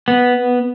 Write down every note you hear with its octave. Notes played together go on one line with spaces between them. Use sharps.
B3